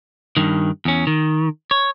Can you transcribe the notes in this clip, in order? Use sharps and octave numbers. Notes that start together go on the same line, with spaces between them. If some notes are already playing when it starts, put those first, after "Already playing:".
G2 D#3
E2 C#4
D#3
C#5